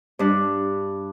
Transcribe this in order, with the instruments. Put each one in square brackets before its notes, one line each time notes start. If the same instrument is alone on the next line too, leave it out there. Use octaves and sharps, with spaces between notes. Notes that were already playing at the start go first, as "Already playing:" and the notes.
[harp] G2 D4